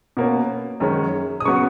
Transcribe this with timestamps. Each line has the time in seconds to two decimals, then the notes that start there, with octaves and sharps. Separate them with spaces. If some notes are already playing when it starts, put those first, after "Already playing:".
0.17 B2 A#3 C#4
0.80 F#2 D#3 G#3 C#4
1.40 D#6
1.45 C#3 F#3 B3 C#6